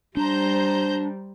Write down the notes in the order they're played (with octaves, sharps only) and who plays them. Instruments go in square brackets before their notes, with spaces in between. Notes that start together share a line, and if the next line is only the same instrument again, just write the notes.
[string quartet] G3 [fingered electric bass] D4 [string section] C5 A#5 G6